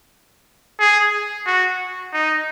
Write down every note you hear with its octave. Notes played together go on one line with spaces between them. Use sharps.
G#4
F#4
D#4